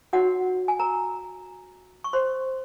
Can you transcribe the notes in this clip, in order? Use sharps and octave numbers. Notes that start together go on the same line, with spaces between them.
D#4 F#4 A#4 C#5 F#5
G#5
A#4 A#5
C#6
C5 C6